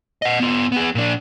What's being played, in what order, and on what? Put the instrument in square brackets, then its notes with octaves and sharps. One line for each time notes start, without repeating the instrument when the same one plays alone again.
[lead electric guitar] D#5 F#5
B3 F4
B3 G#4
A#2 D4